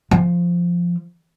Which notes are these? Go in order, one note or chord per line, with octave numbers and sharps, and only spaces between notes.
F3